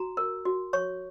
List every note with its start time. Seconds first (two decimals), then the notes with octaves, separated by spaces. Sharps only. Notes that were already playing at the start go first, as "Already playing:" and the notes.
Already playing: F#4 A#5
0.17 A#4
0.45 F#4
0.73 C#5 C#6